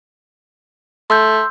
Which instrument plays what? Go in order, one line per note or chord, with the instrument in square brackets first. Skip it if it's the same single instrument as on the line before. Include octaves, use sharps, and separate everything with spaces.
[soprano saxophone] A3 [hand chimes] C6 E6 G6